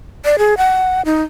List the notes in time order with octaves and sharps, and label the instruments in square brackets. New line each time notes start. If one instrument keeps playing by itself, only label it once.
[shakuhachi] D5
G#4
F#5
D#4